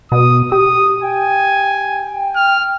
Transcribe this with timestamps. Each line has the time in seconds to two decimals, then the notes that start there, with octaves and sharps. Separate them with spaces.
0.12 B2 D#6
0.52 G4 D#6
1.03 G5 G#5
2.36 F6